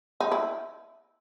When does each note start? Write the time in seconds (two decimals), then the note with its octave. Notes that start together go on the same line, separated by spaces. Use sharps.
0.20 D#4
0.32 E4